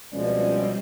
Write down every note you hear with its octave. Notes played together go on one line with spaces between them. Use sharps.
C#2 B2 F3 G3 G#3 C4 C#4 D5